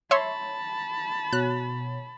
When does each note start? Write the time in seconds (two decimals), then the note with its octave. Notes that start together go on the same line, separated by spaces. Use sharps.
0.11 C#5 E5 A5 B5 C6
1.33 B2 F#4 C#5 F#6